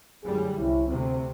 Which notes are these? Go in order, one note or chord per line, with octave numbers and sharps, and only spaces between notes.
F#2 A2 D3 G3 G#4
C2 C#4 E4
D2 C3 C4